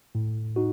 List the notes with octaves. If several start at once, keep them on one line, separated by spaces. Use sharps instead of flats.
A2
D#4 F#4